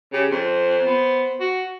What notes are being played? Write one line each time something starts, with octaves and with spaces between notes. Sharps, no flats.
C#3 G4
F2 C5
B3
F#4